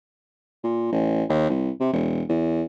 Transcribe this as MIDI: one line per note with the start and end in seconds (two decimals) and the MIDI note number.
0.64 0.92 46
0.92 1.23 33
1.29 1.48 39
1.50 1.71 36
1.80 1.90 48
1.93 2.23 28
2.29 2.64 40